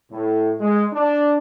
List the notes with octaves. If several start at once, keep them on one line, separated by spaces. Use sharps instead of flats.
A2
G#3
D4